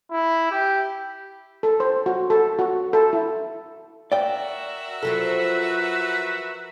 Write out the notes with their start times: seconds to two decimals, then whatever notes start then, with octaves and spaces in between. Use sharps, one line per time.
0.11 E4
0.51 G4
1.63 A4
1.80 C5
2.06 F#4
2.30 A4
2.59 F#4
2.93 A4
3.13 E4
4.12 F#4 A#4 D5 E5 G5
5.03 F3 F#3 A4 B4